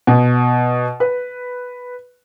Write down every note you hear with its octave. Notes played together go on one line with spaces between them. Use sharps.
B2
B4